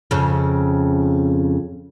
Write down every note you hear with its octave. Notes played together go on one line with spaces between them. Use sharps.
F2 C#3